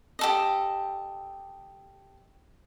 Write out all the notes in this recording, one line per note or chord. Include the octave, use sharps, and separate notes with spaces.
G4 A4 D#5